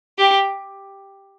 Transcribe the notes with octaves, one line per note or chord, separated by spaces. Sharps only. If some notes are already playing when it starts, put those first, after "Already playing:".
G4